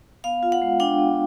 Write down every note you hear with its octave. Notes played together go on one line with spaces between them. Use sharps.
B3 F5
F4
F#5
G#3
D4 G5
B3